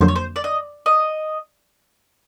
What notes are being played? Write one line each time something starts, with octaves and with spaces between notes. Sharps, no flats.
F2 D3 F#3 A#3 C5
C#5
C5
D5
D#5
D#5